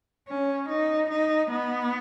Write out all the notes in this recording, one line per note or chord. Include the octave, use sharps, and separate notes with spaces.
C#4
D#4
D#4
B3